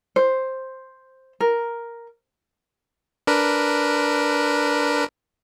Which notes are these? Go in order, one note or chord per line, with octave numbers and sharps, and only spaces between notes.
C5
A#4
D4 A#4 B4